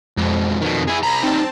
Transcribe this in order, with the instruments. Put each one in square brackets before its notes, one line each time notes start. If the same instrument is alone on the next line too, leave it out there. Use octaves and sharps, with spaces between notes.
[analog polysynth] F2 [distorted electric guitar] G#2 B2
[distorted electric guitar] B2 D#3
E4 G#4
[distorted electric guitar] C2 A#5 [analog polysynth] B5 A#6
[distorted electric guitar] G3 D#4 [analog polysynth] C4 A5